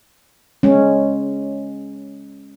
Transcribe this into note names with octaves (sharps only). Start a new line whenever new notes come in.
G#3 C#4